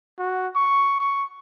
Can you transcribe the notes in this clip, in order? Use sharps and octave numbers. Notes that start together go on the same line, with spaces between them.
F#4
C#6
C#6